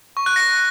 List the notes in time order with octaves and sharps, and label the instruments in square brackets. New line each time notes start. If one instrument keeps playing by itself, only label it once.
[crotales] C#6
F#6
A#6